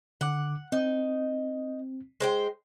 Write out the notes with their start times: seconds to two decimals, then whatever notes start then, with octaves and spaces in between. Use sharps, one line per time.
0.21 D3 F#5 D6
0.72 C4 D#4
2.20 G#3 C5 G5